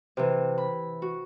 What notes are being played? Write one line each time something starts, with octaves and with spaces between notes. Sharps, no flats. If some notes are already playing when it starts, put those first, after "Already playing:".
C3 E3
B5
F#4